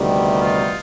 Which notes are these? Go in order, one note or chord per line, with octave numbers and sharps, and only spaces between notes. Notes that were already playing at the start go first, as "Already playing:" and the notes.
Already playing: D2 C3 D#3 G3 B3
D#4 F4